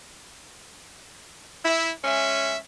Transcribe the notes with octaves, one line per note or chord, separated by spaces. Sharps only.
E4
G#3 C#4 E5